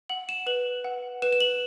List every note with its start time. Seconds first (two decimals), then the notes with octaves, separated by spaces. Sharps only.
0.09 F#5 F#7
0.29 E7
0.46 B4 F#7
0.84 F#5
1.22 B4 E7
1.33 E7
1.40 F#7